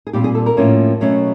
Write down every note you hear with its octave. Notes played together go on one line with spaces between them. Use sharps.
G#4
A#2 G3 C4 G4
G#4
A4
A#4
A2 F3 A#3 C#4
B2 F#3 A3 C#4